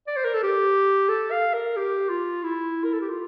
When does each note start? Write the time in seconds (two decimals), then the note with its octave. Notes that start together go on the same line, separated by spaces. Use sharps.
0.07 D5
0.16 C5
0.25 A#4
0.34 A4
0.43 G4
1.09 A4
1.31 F5
1.53 A#4
1.76 G4
2.09 F4
2.43 E4
2.84 A#4
2.93 A4
3.01 G4
3.10 F4